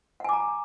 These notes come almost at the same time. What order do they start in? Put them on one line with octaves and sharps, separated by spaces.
F#5 G#5 D6 A#5